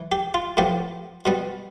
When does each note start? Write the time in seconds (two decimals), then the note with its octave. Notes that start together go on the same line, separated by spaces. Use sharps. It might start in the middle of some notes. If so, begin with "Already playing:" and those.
Already playing: E3
0.12 G4
0.34 F4
0.57 A2 F3 B3 G4
1.26 B2 G3 B3